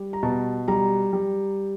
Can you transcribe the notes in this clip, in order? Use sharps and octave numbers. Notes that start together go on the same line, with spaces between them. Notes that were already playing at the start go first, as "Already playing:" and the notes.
Already playing: G3
A#5
B2 A5
G3 A#5
G3